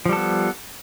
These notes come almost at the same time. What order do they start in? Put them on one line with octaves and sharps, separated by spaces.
F3 G3 A4 B3